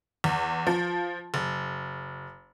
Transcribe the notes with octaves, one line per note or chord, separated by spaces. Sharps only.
E2
F3
F#1